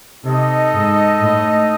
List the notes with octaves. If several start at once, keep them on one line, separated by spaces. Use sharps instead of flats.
C3 D#4 A4 D#5
G#2
A2